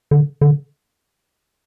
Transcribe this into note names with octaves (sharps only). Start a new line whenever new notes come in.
D3
D3